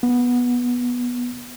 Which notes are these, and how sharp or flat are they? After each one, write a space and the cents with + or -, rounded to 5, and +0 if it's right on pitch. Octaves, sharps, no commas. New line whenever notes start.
B3 -10